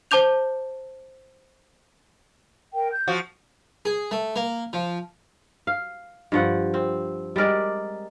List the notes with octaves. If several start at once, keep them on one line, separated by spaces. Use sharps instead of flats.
C5 A5 D6 G6 F7
A#4 G5
G6
F3 F#4
G#4
A3
A#3
F3
F5
G2 F3 F#5
C4
G3 G#3 A#4 D5